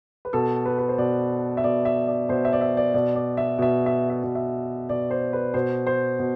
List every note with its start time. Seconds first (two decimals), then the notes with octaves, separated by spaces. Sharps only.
0.25 B4
0.33 B2 A4
0.66 B4
0.78 B4
0.89 C5
0.98 B2 D5
1.57 E5
1.64 B2 D5
1.85 E5
2.07 D5
2.29 B2 C5
2.45 E5
2.53 D5
2.61 E5
2.77 D5
2.94 B2 D5
3.15 D5
3.37 E5
3.59 B2 E5
3.86 E5
4.10 E5
4.24 B2
4.35 E5
4.89 B2 D5
5.10 C5
5.33 B4
5.54 B2 C5
5.87 C5
6.19 B2